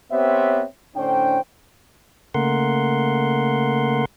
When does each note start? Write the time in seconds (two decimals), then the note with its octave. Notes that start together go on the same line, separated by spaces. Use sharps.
0.12 B3 C4 G4 C5 C#5 E5
0.96 A2 D3 C#4 D4 C5 G5
2.34 C#3 A3 A#3 A#4 F#5 C6